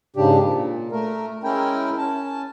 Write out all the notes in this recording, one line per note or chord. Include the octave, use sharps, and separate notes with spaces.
G#2 C#3 D4 G4
A#2
A3 A#4
G#3 C#4 E4 A#4 G5
C#4 A5